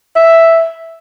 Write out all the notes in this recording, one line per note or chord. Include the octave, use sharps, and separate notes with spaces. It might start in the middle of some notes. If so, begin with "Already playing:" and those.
E5